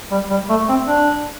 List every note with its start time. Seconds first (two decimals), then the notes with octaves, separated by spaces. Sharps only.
0.11 G3
0.30 G3
0.49 A3
0.68 C4
0.87 D4